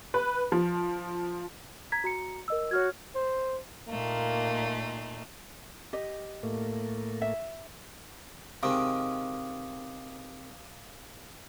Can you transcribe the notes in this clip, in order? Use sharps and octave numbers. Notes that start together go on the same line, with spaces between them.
B4
F3
A#5 G#6 B6
F#4 A#5 C#7
A#4 D#5 E6
F#4 C#5 F6 G#6
C5
A#2 A3 A#3 D#4
G4 D#5
A2 A3 A#3
E5
C3 D#3 G#3 F5 D6 D#6